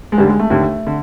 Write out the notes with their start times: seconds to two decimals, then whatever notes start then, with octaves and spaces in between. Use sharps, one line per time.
0.12 G#3
0.18 D#2 D3 G3
0.28 G#3
0.39 A3
0.50 D#2 D3
0.87 D3